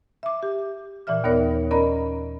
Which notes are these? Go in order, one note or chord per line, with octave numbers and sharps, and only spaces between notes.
E5 D6
G4
A#2 E3 D5 E5 F6
D#2 B3 D#4 A#4 C#5 D5
C#4 A#4 D5 D#5 A#5 B5